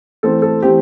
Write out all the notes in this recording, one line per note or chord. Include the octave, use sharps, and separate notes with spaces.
E3 A3 C4 A4
A4
E3 A3 C4 G4